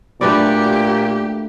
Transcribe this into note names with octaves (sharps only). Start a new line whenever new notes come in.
A#2 A3 D4 F#4 G4 B4 D5 B5